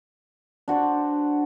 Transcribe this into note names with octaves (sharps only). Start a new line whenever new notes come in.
D4 F#4 C5 D5